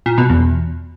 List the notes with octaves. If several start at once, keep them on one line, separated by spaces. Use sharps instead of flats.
A#2
B2
E2